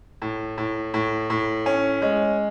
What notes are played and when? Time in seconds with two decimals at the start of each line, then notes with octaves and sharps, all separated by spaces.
0.22 A2
0.58 A2
0.94 A2
1.30 A2
1.66 C#4
2.02 G#3